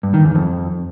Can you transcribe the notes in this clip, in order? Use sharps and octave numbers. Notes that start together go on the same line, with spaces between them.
G2
D#3
E2
F2